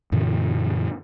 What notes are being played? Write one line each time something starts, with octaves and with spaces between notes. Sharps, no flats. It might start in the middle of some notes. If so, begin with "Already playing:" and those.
F#2 A#2 D3 E3